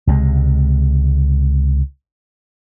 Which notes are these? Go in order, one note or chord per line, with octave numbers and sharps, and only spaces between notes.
C#2 C3 F#3 G#3